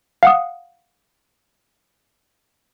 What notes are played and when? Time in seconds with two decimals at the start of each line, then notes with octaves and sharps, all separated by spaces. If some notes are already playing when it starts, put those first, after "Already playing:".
0.23 F5 F#5 D#6